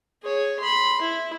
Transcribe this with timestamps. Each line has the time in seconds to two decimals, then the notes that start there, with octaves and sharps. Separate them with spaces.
0.23 G#4 C#5
0.60 B5 C6
1.02 E4